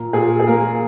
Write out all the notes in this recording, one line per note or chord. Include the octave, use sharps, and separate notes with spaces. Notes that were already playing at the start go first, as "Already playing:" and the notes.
Already playing: A#2 A#4
A#2 G#4
G#4
A#3 A#4